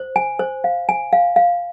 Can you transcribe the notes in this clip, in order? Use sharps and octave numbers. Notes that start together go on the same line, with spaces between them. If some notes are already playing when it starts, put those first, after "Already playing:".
Already playing: C5
G#5
C5
F5
G#5
F5
F5